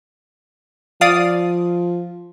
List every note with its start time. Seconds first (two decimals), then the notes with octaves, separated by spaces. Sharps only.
1.01 F3 D5 F5 D#6